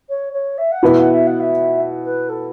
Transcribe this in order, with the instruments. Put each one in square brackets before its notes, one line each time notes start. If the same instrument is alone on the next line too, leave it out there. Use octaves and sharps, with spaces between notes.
[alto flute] C#5
C#5
E5
F#5
[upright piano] B2 B3 E4 [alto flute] E5
[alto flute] F#5
E5
F#5
E5
B4
A4